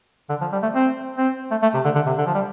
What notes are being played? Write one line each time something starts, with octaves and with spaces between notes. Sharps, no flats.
D3
F3
G3
A3
C4
C4
A3
A3
C3
D3
D3
C3
D3
F3
G3